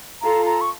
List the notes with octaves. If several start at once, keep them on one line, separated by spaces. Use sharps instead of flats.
F4 A4 A#5
A#5
C#6